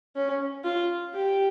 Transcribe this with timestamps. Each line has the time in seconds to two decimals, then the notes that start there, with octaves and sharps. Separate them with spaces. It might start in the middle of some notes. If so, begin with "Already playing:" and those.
0.16 C#4
0.64 F4
1.14 G4